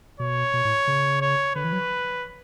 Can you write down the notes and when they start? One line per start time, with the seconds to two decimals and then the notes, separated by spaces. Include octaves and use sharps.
0.20 B2 C#5
0.54 B2
0.65 A2
0.87 C#3
1.21 C#5
1.56 D3 B4
1.64 E3
1.72 F#3